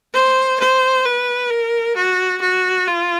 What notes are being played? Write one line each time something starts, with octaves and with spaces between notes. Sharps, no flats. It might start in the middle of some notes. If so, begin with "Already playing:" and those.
C5
C5
B4
A#4
F#4
F#4
F4